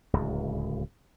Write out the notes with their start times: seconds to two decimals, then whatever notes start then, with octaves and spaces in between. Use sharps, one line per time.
0.13 D1 C#2